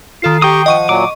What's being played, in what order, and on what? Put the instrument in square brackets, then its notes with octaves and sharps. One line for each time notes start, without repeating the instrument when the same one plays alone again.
[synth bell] D#3 A4 C7 [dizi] F4
[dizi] G4 [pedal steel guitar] G5 D#6 [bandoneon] A#5 C#6
[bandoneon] F3 [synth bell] D#5 C#6 D#7 [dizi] F#5
[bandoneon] A#2 F#3 [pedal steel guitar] D6